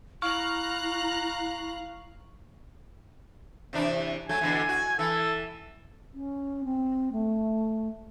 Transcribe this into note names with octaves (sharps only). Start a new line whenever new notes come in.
E4 F5 A#5 C#6 F6 F#6
C3 E3 D4
F#3 A3 G#5
B2 D3 E3
F#4
E3 A4
C#4
C4
A3